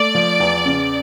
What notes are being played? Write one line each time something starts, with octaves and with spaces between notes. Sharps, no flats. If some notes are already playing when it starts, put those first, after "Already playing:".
Already playing: A3 D5
F3
E2
C#3